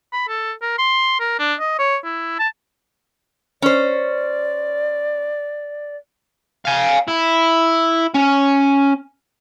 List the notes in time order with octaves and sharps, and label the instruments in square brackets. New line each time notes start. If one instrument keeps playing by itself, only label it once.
[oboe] B5
A4
A#4
C6
A#4
D4
D#5
C#5
E4
A5
[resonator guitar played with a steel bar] C#4 C5 [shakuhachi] D5
[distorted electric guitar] F5 G#5
E4
C#4